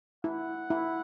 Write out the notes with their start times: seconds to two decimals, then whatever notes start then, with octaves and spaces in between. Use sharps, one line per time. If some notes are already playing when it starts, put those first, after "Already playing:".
0.24 E4 F#5
0.70 E4